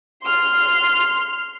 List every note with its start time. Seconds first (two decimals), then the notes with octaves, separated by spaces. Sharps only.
0.23 C6 F6